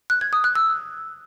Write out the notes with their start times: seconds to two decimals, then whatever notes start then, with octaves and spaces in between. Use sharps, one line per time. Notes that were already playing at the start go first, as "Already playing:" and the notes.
0.10 F#6
0.21 G#6
0.33 D#6
0.44 F#6
0.55 E6